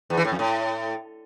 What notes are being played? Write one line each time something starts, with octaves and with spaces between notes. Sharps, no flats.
E2
E3
A2
F2
A2